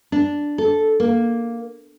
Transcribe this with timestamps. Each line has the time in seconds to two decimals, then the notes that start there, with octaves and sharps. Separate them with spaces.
0.12 D4
0.58 A4
1.00 A#3